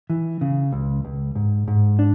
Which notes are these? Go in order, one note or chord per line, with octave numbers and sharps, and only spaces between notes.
E3
C#3
C#2
C#2
G#2
G#2
D4